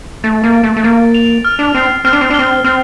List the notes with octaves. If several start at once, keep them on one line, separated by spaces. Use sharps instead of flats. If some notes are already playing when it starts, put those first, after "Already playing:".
A3 A6
A#3
D7
A3
A3
A#3 A6
F7
F6
D4
C4 C7
C4 F6
D4
C4
D4
C4 G7
C4 F6